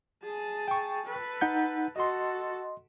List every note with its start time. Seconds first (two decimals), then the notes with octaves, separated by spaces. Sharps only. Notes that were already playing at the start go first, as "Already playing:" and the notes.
0.23 G#4 A5
0.68 G5 C#6
1.06 A4 B4
1.41 D#4 F#5 G6
1.96 F#4 A4 D#5 C6